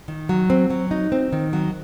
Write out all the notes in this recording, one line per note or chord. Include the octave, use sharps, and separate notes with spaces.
D#3
F#3
C4
F#3
D#4
C4
D#3
F#3